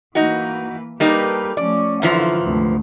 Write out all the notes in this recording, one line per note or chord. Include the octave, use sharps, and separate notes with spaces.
E3 A#3 D#4 F#4 B4
G3 A#3 D#4 G4 A4 B4
F3 A3 C#4 D5
F#2 D3 E3 F3 E4 F4
D2 G#2 C3